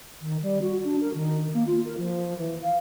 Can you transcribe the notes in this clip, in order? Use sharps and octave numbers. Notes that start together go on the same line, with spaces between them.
D#3
G3
F#4
D4
A#4
D#3
A#3
F4
A#4
F3
E3
F5